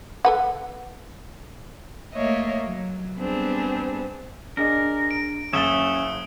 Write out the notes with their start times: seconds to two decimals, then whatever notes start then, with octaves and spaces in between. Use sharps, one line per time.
0.25 A4 B4 F#5
2.14 A3 A#3 C#5 D#5 E5
2.65 F#3
3.18 G3 B3 C4 D4 G#4
4.57 D4 G#4 A#4 D#5
5.11 D7
5.53 F#1 C#4 E5 D#6 E6 A6 G7